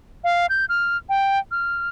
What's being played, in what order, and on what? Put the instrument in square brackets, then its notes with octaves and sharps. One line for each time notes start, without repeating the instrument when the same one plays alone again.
[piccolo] F5
G6
F6
G5
F6